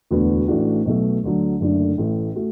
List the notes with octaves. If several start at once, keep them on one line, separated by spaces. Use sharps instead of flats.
E1 D2 D3 B3 F#4
A1 A2 A3 D4 F#4
B1 B2 A3
D2 D3 F#3
F#1 F#2 D3 A3 D4
A1 A2 A3
A3 F#4